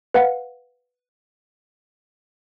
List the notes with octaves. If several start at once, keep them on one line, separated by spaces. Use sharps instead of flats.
B4 F5 F#5